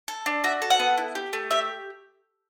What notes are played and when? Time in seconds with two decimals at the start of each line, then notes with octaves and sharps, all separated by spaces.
0.08 A4
0.26 D4
0.44 F#4 E5
0.62 A4
0.70 F#5
0.79 B3
0.98 E4
1.15 G4
1.33 A3
1.51 G4 E5